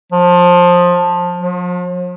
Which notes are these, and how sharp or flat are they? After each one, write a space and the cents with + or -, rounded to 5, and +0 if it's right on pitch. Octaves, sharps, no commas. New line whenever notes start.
F3 +20
F3 +45